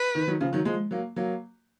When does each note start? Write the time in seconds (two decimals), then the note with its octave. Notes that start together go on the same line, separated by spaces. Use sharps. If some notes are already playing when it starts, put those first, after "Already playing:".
Already playing: B4
0.15 D#3
0.27 D#3 F#3
0.41 C#3 F3
0.53 D#3 F#3
0.65 F3 G#3
0.91 F#3 A#3
1.16 F#3 A#3